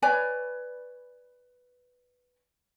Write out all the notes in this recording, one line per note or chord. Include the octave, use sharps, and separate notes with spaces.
B4 C#5 D5 G#5